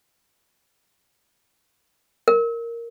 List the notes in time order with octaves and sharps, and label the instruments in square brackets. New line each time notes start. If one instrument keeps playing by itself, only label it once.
[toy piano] A#4